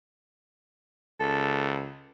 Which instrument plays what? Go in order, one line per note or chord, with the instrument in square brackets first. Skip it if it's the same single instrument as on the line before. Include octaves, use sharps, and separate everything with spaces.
[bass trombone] C#2 [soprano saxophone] A4